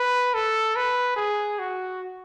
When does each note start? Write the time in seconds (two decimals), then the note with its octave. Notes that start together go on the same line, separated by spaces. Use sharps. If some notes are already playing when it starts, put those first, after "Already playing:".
Already playing: B4
0.34 A4
0.76 B4
1.16 G#4
1.59 F#4